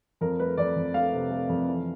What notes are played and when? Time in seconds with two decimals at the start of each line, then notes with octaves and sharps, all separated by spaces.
0.21 F2 A#4
0.40 A3 B4
0.57 F2 D5
0.76 F2
0.94 A3 F5
1.13 C3
1.31 A3
1.49 F2
1.68 E3